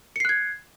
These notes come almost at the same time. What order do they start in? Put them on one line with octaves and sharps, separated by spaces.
C#7 C7 F#6 G#6